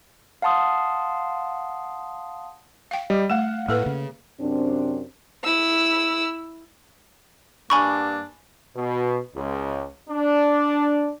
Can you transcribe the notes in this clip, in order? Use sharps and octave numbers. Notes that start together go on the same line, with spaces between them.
F5 F#5 A5 C6 D#6
F5 G5
G3 D#5
A3 F5 F#5 E7
A2 A#3 A4 B4
C#3
F#2 C3 C4 D4
E4 E6
G2 A#3 D4 G#5 B5 C#6
B2
C#2
D4